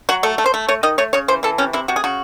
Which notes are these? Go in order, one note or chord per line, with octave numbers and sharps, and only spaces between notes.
F#3 F#4
A3 A4
A3
C5
A3
A3 C#5
D#3 D#5
A3 C#5
C#3 C#5
E3 C5
E3 A4
C3 C#4
C3 E4
C3 F#4
G#4
C#3 F#4